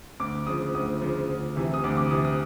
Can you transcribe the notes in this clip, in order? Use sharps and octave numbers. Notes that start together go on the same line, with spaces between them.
D2 D6
C#3 F3 D#6
D2 D#6
C#3 F3
D2
C3 E3
D#6
D2 D6
D6
C3 E3 D#6
D#6